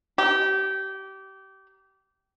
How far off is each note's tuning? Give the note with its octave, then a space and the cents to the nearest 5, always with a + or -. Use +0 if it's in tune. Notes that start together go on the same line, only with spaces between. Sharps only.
G4 -25